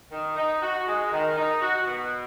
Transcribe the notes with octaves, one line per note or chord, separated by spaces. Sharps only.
D#3
D#4
F#4
G#3
D#3
D#4
F#4
B2